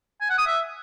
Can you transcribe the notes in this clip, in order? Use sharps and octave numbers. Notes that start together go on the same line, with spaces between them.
G#5
F#5
D#6
E5